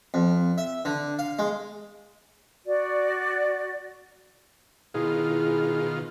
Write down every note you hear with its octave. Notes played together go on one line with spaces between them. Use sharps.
F2
E5
D3
F5
G#3
F#4 D5
B2 D#3 E4 F4 G#4